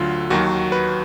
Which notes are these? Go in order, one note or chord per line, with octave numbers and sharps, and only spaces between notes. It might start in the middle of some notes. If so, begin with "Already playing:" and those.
Already playing: D2 D3 F#3 F4
D#2 D#3 F#3 F#4
B4